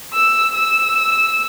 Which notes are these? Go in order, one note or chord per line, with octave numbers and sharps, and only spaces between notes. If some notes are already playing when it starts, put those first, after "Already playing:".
E6
E6